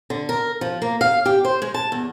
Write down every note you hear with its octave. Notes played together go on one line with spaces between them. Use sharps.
D3
A#4
F3
A#3
F5
G4
C5
G#3
A5
E2